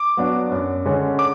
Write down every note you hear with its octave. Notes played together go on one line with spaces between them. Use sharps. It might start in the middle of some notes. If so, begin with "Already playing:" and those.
Already playing: D6
F#3 B3 D4 F#4
F#2
D3 G#3 C#4
D6